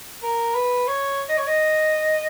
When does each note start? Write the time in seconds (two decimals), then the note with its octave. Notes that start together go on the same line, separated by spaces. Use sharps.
0.23 A#4
0.55 B4
0.88 C#5
1.29 D#5
1.37 C#5
1.47 D#5